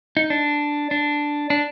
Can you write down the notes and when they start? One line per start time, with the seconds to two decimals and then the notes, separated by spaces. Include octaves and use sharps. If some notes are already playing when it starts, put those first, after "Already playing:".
0.17 D#4
0.30 D4
0.91 D4
1.50 D4